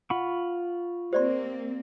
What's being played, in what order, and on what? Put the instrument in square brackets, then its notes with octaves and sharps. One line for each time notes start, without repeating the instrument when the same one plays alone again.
[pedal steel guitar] F4 B5 C#6 [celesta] F#5
[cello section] A#3 C4 [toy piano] G4 D5 C6 [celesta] C5